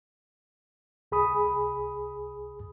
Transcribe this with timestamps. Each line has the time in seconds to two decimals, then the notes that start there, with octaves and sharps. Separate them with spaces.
1.12 C2 G#4 B5 D#6